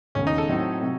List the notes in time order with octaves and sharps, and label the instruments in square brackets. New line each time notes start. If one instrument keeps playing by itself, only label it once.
[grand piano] E1 D#2 C#3 [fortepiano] C#4
[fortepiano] D#4
A4
[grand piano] A2 F#3 C4 D#4
C3 F#3